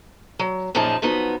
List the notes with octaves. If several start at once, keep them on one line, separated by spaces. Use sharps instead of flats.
F#3
F#2 A#2 F3 D#4 G#4 A5
F3 F#3 B3 D#4